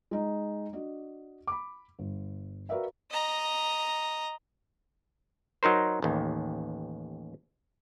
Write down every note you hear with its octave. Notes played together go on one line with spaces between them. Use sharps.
G#3 D#4
D4 F#4 D#5
B5 D6
G1
F#4 A#4 B4 D5 E5 F5
D#5 A#5
F#3 D#4 A#4 C5
A1 D#2